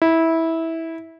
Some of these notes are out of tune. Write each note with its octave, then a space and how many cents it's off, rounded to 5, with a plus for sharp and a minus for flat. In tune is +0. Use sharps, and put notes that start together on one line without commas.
E4 -15